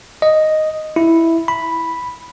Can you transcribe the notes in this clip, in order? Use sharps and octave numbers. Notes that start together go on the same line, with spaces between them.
D#5
E4
B5